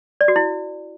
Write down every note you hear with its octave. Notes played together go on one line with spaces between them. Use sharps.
D5
F#4
E4